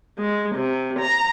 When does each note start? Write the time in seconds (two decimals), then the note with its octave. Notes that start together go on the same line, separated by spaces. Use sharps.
0.17 G#3
0.56 C3
1.00 A#5